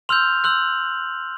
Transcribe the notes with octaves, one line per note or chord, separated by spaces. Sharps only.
C6 E6 F6 G6 F7
C6 E6 F#6 G6 F#7